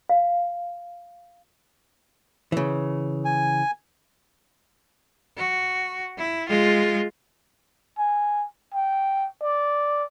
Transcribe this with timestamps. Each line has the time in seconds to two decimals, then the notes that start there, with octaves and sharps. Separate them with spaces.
0.09 F5
2.52 C#3 E3
3.25 G#5
5.37 F#4
6.18 E4
6.48 G#3 F4
7.98 G#5
8.74 G5
9.43 D5